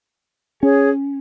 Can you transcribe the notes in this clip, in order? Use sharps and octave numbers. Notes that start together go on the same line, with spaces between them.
C#4 G#4 C#5